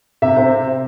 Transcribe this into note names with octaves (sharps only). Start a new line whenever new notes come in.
C3 E5
C3 C5